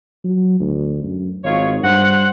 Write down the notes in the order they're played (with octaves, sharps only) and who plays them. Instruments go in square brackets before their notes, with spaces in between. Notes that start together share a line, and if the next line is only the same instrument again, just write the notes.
[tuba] F#3
D2
F#2
[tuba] G#1 [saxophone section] D#3 F4 C#5
[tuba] G2 [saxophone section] C5 F#5